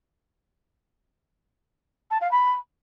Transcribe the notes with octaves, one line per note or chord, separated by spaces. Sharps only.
A5
F5
B5